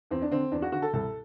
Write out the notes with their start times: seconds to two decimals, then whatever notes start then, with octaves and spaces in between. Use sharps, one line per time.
0.11 E2 C4
0.22 D4
0.31 D3 C4
0.52 E2 D4
0.62 F#4
0.72 D3 F#4
0.82 A4
0.93 C2 A4